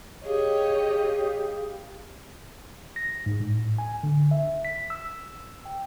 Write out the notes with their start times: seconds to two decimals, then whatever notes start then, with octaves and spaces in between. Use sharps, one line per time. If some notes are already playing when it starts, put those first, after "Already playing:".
0.24 G4 G#4 C#5 D#5 F5
2.96 A#6
3.26 G#2
3.40 A2
3.78 G#5
4.03 D3
4.31 E5
4.65 B6
4.90 E6
5.65 G5